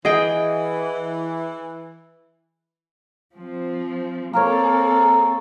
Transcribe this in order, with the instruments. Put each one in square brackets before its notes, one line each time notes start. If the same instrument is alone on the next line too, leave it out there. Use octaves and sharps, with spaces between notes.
[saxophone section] E3 [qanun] G#4 G5 [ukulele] D#5 F#5
[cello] F3 C4
[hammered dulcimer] A#3 A#4 C#5 [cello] C4 A4